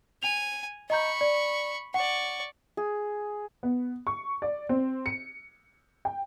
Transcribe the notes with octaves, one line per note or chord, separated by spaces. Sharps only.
G#5 F7
D#5 A#5 B5 C#6 G6
D5
D5 F#5 C#6
G#4
B3
C#6
D5
C4
C#7
G5